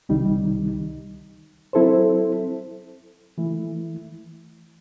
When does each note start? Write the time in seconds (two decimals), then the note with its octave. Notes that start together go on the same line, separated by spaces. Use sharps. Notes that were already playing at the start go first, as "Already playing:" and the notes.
0.09 C2 C3 D#3 G3 D#4
1.73 F#3 C4 E4 A4 C5
3.38 E3 A3 E4